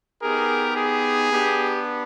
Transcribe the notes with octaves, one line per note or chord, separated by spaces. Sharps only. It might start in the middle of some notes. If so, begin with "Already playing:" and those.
B3 D#4 G4 G#4 A#4
G#4
B3 D4 G4